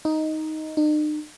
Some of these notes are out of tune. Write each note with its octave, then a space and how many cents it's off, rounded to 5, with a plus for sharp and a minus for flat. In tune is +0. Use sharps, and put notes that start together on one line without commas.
D#4 +5
D#4 -45